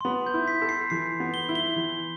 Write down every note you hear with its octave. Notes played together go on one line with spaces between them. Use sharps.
C6
B3 B5
G6
E4
B6
A4
C7
E3 C7
B3
G7
E4
G7
E3